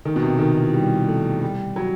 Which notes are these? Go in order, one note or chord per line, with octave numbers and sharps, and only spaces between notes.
D#3
B2
C3
D#3
E3
G3
A3
G3
F#3